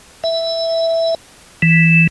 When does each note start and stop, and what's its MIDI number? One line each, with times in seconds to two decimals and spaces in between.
0.24 1.15 76
1.62 2.07 52